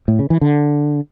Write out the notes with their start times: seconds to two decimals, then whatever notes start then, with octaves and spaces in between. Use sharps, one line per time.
0.08 A2
0.19 C#3
0.30 E3
0.41 D3